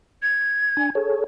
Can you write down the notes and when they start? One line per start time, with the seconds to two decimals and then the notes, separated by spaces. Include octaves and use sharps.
0.23 G#6
0.77 D4 G#5
0.95 G#4 A4 C#5